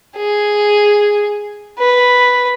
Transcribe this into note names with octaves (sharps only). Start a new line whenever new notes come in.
G#4
B4